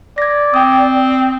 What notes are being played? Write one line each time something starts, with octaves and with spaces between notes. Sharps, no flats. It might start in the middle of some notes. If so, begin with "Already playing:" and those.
D5 G#6 A#6
C4 G5 D#6